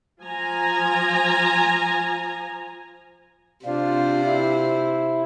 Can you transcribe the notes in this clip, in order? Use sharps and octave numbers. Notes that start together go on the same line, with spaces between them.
F3 G#5 A#5
C3 D4 F4 C5
E4